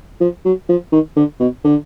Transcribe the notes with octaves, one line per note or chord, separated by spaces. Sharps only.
F3
F#3
F3
D#3
D3
B2
D3